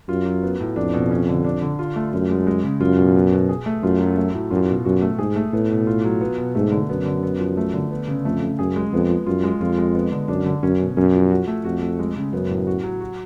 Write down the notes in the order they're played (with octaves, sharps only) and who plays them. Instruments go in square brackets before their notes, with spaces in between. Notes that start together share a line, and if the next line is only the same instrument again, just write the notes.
[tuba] F#2 [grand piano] F4
[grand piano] F#3
B3
A2
[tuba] F2 [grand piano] D4
[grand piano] B2
C#4
D3
D4
D3
F4
A3
[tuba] F#2 [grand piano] F4
[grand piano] G#3
G#3
C#3
[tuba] F#2 [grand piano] F4
[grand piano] B2
B3
B2
G#4
A3
[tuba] F#2 [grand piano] F4
[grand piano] F#3
A3
A2
[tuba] F#2 [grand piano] F4
[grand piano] B2
[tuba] F#2 [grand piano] F#4
[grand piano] A3
[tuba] G#2 [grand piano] G#4
[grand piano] A3
[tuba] A2 [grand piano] B3
[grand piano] B2
F4
F#3
B3
B2
[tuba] G#2 [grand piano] A3
[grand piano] D3
[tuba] F#2 [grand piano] B3
[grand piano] D3
B3
F3
A3
D3
B3
C#3
[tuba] F2 [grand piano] A3
[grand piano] C#3
[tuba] F#2 [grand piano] G#4
[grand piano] G#3
[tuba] F2 [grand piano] B3
[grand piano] F3
[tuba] F#2 [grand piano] F4
[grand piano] G#3
[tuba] F2 [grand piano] F4
[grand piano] G#3
B3
D3
[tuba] F#2 [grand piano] D4
[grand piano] D3
[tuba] F#2 [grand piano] C#4
[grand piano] B2
[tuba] F#2 [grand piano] C#4
[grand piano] F3
F#4
A3
[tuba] F2 [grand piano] F#4
[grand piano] A3
G#3
C#3
[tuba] F#2 [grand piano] B3
[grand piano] A2
F#4
F#3
F#4